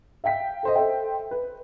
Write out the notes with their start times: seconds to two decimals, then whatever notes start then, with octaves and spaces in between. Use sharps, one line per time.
0.24 E5 F5 G5 B6
0.63 A4 C5 D#5
0.76 A4 C5 E5 G5
1.31 B4